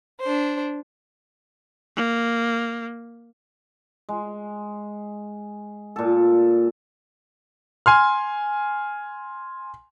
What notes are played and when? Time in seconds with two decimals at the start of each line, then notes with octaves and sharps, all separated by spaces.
0.20 D4 C5
1.96 A#3
4.09 G#3
5.96 A#2 A4
7.86 G#5 C6 F6